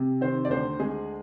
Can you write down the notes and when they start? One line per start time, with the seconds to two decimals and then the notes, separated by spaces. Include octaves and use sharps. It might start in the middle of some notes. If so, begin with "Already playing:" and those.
Already playing: C3
0.21 D#3 C5
0.45 D5
0.50 D2 C5
0.80 G#3 G#4